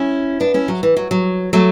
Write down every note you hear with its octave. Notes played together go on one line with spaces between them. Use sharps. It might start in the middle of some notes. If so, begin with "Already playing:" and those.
Already playing: C#4 E4
B3 D4
C#4 E4
F#3
E3
F#3
F#3
F#3 A3